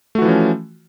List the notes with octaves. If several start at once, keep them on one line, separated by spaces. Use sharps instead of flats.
E3 F3 A3 C#4 F#4